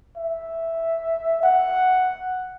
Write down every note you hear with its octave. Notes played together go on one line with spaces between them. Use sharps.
E5
F#5